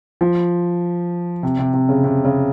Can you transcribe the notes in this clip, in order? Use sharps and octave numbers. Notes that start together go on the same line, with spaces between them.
F3
C3
C3
C3
C#3
C3
C#3